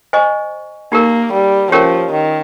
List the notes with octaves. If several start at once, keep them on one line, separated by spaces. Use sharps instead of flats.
C5 D#5 G#5 C#6
A#3 D#4 G4 A#4
G3
F3 C#4 G4 A#4 C#5
D#3